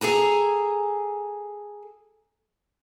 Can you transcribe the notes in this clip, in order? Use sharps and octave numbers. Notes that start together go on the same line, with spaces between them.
G#4 A4 G#5 A#5